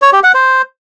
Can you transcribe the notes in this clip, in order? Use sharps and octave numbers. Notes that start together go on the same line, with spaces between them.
C#5
G4
F#5
C5